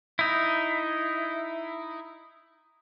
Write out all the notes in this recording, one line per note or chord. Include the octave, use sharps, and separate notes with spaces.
D#4 E4